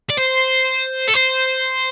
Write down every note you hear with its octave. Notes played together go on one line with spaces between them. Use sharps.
D5
C5
A4
C5